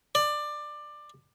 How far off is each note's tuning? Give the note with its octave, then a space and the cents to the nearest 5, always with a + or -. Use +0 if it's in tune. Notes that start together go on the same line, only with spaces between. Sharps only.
D5 +20